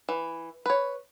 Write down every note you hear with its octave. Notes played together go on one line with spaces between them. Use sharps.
E3
B4 C#5